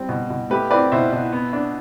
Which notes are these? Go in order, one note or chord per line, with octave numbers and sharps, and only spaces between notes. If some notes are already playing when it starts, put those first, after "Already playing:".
Already playing: G3 C4
B2
B2
A3 G4 B4
C4 B4 D5
B2 C5 E5
B2
B3
D4